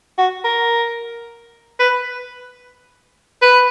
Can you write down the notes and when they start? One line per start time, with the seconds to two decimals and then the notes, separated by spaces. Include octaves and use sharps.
0.18 F#4
0.44 A#4
1.80 B4
3.42 B4